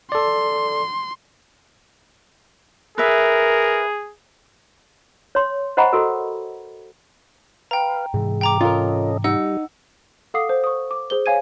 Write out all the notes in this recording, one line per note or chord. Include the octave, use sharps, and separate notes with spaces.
A4 D5 C6
G#4 A#4 B4 E5
C#5 C6
C5 D#5 F#5 A#5 B5 C#6
F#4 A4 A#4
B4 F5 G5 A#5
G#2 C3 E3 G#3
G5 A#5 D6
C#4 F4 A4 A#4 D#5
G3 D#4 F#5 E6
A4 F5 F#5 D6 D#6 C7
C5
C#6 D#6
D6
G#4 C5 G7
C#5 F5 G#5 G#6 D#7